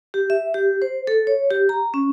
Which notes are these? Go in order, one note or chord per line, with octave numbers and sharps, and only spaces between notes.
G4
E5
G4
C5
A4
C#5
G4
A#5
C#4